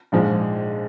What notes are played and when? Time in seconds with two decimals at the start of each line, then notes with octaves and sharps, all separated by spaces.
0.12 A#1 G#2 F3 G#3